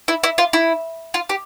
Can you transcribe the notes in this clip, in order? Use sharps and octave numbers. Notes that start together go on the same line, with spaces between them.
E4
E4
F4
E4
F4
G4